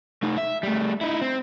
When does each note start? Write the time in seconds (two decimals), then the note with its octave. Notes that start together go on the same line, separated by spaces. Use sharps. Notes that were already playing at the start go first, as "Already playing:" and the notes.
0.23 A3 D#4
0.38 E5
0.63 G3 A3
1.01 D#4 E4
1.22 C4